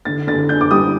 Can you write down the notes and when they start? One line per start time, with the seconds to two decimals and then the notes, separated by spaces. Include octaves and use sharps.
0.05 D3 A6
0.27 D3 A6
0.49 D4 G6
0.61 D6
0.71 G3 D#6